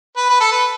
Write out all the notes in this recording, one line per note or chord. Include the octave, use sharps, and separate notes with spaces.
B4
B4
A4
B4